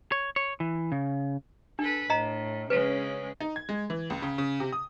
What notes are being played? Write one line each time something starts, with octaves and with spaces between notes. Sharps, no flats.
C#5
C#5
E3
C#3
D4 A4 B4
A2 D#5 A#5
C#3 G#3 C#4 B4
D#4
G#6
G#3
E3
C#2
C#3
C#3
C3
D#6